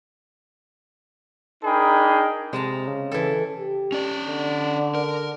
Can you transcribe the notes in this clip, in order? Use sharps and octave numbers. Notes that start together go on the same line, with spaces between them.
D4 D#4 G#4 A#4 G5 B5
C3 G#3 A5 A#5
C#3
E3 A4
G4
C#4 D5
D3
A#4